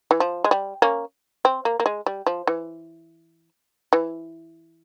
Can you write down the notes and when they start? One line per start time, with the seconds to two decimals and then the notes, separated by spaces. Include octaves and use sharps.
0.11 E3
0.20 F3
0.44 G#3
0.51 G3
0.82 A#3 C#4
1.45 C4
1.65 A#3
1.80 A#3
1.86 G#3
2.06 G3
2.27 F3
2.47 E3
3.93 E3